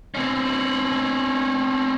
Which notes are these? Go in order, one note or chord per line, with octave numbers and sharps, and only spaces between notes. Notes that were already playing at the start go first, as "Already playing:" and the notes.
C4 C#4